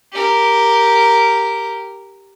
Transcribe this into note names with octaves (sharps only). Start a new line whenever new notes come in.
G4 A#4